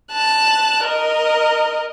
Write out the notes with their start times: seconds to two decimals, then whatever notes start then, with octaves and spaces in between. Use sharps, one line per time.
0.12 A5 F#6
0.84 A#4 D#5